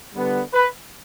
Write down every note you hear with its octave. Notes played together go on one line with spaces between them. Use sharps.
D3 G3 B3
B4